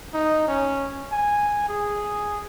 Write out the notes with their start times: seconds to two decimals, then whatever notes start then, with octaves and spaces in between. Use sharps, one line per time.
0.14 D#4
0.48 C#4
1.12 G#5
1.69 G#4